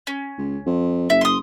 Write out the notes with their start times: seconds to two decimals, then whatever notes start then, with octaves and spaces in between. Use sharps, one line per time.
0.07 C#4
0.38 C#2
0.66 F2
1.10 F#1 E5
1.21 C6 D#6